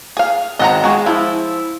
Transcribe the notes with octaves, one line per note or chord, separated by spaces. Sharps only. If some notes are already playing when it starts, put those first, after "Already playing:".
G#4 F5
G#1 D#5 F#5 A#5
G#3 F#4 G#5
F3 E4